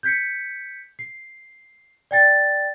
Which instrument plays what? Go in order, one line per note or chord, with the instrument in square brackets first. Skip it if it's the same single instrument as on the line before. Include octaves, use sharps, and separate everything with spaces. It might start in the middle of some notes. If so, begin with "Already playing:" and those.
[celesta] G6 G#6 B6 C#7
C7
D5 G5 A6